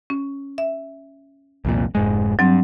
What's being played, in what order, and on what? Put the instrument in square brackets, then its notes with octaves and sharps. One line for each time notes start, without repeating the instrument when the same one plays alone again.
[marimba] C#4
E5
[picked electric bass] C2 F2 A#2
F1 G#2 G#3
[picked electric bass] G2 [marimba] F#3 C4